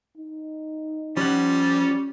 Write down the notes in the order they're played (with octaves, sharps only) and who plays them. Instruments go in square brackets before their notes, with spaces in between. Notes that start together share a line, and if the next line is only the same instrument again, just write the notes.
[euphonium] D#4
[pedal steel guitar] F3 F#5 [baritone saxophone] G3 [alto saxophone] C#4